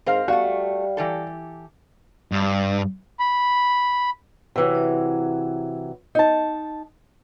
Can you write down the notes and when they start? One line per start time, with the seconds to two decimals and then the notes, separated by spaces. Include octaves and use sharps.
0.06 G#2 C4 A#4 F5
0.28 G3 A3 F#4 F5
0.97 E3 G4 A4
2.32 G2
3.20 B5
4.56 C3 E3 F#3
6.15 D#4 A5